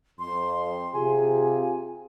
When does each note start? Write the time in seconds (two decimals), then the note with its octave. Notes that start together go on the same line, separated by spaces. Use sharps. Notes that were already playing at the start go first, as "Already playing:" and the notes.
0.19 F2 C6
0.94 C3 F4 G#4 G#5